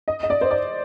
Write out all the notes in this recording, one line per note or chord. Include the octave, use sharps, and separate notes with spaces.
D#5
D#5
D5
C5
D5